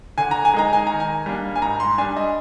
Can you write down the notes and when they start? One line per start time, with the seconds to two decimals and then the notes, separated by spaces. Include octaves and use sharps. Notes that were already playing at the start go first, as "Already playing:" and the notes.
0.18 D3 G#5
0.31 A#5
0.45 G#5
0.54 G#3 D#4 A#5
0.73 G#5
0.87 D#3 A#5
1.00 G#5
1.26 G3 A#3 D4
1.56 G#5
1.62 G#2 A#5
1.80 C6
1.98 G3 D4 G#5
2.17 D#5